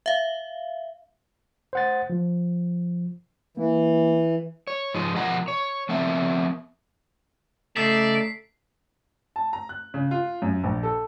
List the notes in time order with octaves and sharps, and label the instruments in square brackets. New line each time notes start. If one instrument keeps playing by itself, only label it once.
[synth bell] E5 F5
[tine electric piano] C5 F#5 A6
F3
[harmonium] E3 [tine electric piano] A#3
[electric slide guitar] C#5
G#2 F3 G#3 D#4
B2 F3 A#4 F#5 A#5
C#5
F3 B3 C4 A#4 E5
[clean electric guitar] C#3 D#4 E5 [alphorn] A3 [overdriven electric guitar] D5 [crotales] B6 C7
[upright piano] A5
A#5
F#6
C#3
F4
F#2
A#1
A4